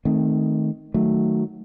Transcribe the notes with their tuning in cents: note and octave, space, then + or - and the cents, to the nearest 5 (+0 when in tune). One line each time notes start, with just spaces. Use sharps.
D#3 +0 A3 -20 C4 +0
D#3 +0 F#3 +0 A3 +0